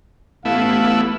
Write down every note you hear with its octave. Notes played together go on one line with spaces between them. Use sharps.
A1 A3 B3 E4 F5